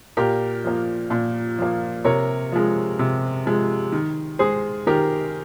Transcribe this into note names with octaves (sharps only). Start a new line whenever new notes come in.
A#2 G4 A#4
F3 A#3
A#2
F3 A#3
C3 A#4 C#5
F3 G#3
C3
F3 G#3
D#3
G#3 G#4 C5
D#3 G4 A#4